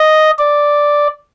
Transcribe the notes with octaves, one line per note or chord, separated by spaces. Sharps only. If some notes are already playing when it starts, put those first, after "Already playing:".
Already playing: D#5
D5